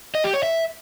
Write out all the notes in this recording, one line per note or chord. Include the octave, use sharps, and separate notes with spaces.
D#5
G4
C#5
E5